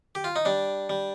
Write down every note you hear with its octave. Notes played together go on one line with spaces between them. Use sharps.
G4
F4
D#4
G3 D4
G3